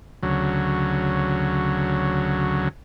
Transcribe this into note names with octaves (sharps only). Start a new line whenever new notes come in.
D2 C#3 F#3